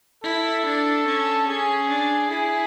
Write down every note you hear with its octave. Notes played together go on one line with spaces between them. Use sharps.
E4 A4
D4
C#4
C#4 G#4
D4
E4 G#4